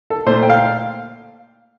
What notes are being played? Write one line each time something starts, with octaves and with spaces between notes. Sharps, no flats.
A4
A#2 A3 C5
G5
F5